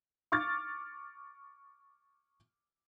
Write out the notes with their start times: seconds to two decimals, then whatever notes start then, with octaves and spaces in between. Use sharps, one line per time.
0.32 C#6 D6 F6 A6